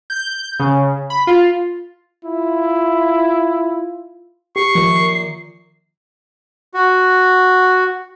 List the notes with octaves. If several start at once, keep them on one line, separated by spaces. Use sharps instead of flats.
G6
C#3
B5
F4
E4 F4
G4 C#6 C7
F#2 A#2 D#3 F3
F#4